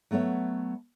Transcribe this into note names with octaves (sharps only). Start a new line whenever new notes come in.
F#3 A3 B3 C#5 E5